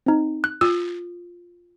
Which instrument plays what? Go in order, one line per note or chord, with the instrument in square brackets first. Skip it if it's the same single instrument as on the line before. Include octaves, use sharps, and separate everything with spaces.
[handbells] C4 D#4
F#6
[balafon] F4 [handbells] E6